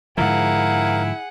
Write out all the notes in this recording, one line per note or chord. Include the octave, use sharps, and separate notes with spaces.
G#2 D3 F3 E4 G#4 A#4 F5 F#5